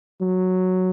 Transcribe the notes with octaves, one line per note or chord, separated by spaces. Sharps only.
F#3